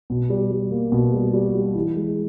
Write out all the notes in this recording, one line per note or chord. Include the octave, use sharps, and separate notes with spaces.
B2
G3
G3
A#3
B2
G3
G3
G3
E3
G#3